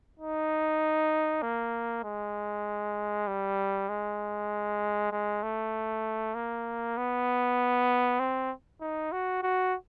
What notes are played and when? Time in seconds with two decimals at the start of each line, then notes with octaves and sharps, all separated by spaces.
0.20 D#4
1.42 A#3
2.04 G#3
3.27 G3
3.89 G#3
5.11 G#3
5.43 A3
6.35 A#3
6.97 B3
8.20 C4
8.81 D#4
9.12 F#4
9.43 F#4